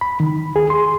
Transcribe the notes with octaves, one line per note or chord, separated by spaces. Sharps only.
B5
D#3
G#4
C6